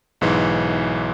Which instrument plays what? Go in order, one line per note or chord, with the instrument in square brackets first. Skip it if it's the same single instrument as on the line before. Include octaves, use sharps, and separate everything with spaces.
[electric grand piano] B1 G#2 E3